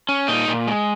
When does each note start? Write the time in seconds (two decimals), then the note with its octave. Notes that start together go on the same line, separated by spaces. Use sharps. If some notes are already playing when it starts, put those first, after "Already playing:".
0.09 C#4
0.28 A#2 D#4
0.48 A#2
0.67 G#3